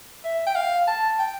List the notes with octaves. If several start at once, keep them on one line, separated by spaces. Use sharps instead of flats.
E5
G5
F5
A5
G5